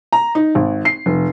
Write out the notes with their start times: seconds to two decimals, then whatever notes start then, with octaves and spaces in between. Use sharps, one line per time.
0.13 A#5
0.35 D#4
0.55 G#1
0.85 C7
1.06 F1